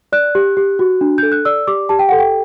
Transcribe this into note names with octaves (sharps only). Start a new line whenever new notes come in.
D5 F#6
G4
G4
F#4
D4
A4 G6
F#6
D5 E6
G4 D6
G4 A5
G5
A4 F#5
G5